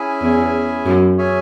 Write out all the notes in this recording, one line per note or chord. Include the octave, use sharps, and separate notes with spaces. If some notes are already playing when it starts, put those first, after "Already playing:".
Already playing: C#4 E4 G#4 E5 G#5
E2
F#2
C#4 G#4 C#5 E5 G#5